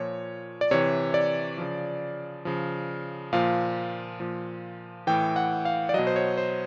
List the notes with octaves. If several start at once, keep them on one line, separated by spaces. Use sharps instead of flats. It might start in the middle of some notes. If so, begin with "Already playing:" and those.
Already playing: A#2 F3 C#5
D5
C3 E3 C#5
D5
C#3 F3
C#3 F3
A#2 F3 F5
A#2 F3
A2 E3 G5
F#5
F5
D5
B2 F#3 D#5
C5
C#5
C5